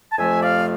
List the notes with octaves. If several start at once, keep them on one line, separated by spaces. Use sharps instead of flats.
A5
F2 C3 F3 A3 E5 G#5
D5 F5